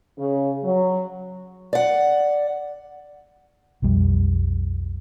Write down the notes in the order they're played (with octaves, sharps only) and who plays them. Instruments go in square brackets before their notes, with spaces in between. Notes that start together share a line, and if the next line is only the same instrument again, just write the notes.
[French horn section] C#3
F#3
[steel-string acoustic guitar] D5 F#5
[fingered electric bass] B1 F2 G3